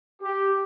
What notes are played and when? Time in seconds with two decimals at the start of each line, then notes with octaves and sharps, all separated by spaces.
0.22 G4